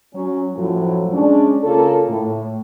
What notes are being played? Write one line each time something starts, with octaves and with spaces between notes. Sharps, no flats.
F#3 C#4
F#2 A2 F3 F#3
G#3 C#4 D4
C#3 A#3 F4 A4
A2